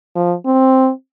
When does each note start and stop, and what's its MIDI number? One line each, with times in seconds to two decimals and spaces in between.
0.16 0.34 53
0.46 0.90 60